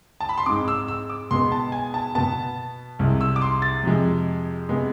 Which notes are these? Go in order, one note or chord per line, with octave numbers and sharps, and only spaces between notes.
A5
B5
C6
G#2 G#3 C4 D6
E6
E6
D6
B2 G#3 B3 C6
A5
G#5
A5
B2 B3 A5
C2 C3 G#3
E6
D6
C6
A6
F2 C3 F3 G#3
C3 G#3 B3